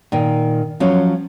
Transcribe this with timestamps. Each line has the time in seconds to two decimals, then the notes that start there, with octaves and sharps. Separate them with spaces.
0.12 A#2 D#3
0.80 F3 F#3 C#4